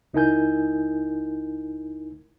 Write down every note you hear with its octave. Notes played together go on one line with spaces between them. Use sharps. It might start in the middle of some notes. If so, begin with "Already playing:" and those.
C#2 D#4 E4 A#4 G#5 G6